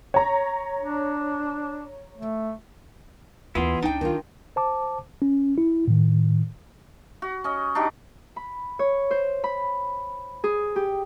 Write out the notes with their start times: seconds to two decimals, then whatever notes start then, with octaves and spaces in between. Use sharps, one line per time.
0.14 C#5 A#5
0.80 D4
2.18 A3
3.55 D#2 E3 G3 B3 E4 F4 G#4 C6
3.82 C#2 C#3 D4 D#4 G5
4.01 D#3 F4
4.56 C5 A5 D6
5.22 C#4
5.58 E4
5.88 A2 D#3
7.22 F#4
7.44 C#4 D#5
7.75 D4 D#4 F#4 G4
8.36 B5
8.79 C#5
9.11 C5
9.44 B5
10.44 G#4
10.76 G4